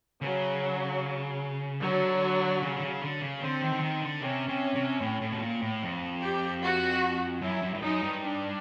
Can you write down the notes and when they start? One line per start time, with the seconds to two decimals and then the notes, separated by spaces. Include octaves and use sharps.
0.22 C#3 F#3
1.81 D3 F#3
2.62 C#3
2.75 D3
2.82 C#3
3.01 D3
3.22 C#3
3.41 D3 C4
3.62 D#3
3.72 D3
3.82 D#3
4.02 D3
4.21 C3 C#4
4.49 C3
4.75 C3
5.01 A2
5.21 A2
5.32 B2
5.42 A#2
5.62 A2
5.83 F2
6.22 G4
6.62 F#4
7.42 F#2 E4
7.62 F#2
7.74 G2
7.82 F#2 D#4
8.02 G2
8.22 D4